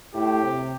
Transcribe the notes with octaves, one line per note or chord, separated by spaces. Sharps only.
A2 G4
C3